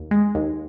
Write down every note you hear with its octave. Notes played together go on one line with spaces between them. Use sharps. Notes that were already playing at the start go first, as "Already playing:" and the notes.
Already playing: D#2
G#3
D#2